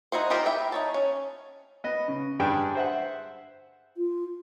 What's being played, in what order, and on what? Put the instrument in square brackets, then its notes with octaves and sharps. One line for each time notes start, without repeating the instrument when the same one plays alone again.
[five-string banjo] D#4 E4 F#4 C5
D#4 F4 G4 A#4 C5
E4 E5 G5
D#4 C#5 A5
C#4
[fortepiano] B3 D#5
C#3
G2 D3 G3 D4 G#4 G5
C5 E5 F#5
[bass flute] F4